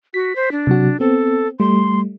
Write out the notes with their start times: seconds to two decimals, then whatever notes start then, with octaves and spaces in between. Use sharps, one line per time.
0.14 F#4 B6
0.36 C5
0.52 D4
0.67 C3 F#3 F#4
1.00 B3 C4 A4
1.60 G3 A3 C6